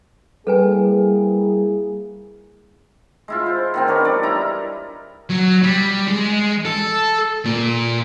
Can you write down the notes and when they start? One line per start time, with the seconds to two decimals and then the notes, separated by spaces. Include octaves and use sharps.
0.47 G3 A#3 E4 G#4 A4 B4 G#5
3.28 G#3 E4 F4
3.46 C5
3.74 D#3 B3 C4
3.88 D4 A#4 B4 C#5
4.04 G3 D5
4.23 D#4 E4 A#5
5.30 F#3
5.63 G3
6.08 G#3
6.65 A4
7.45 A#2